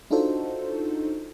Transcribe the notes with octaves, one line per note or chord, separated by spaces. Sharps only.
D4 D#4 F4 F#4 A4 C5